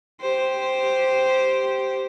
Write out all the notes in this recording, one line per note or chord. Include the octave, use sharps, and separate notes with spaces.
G4 C5